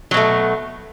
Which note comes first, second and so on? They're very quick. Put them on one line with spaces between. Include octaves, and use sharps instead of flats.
F#3 B2 A3